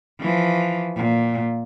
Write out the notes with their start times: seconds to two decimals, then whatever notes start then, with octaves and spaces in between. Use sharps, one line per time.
0.20 E3 F3
0.96 A#2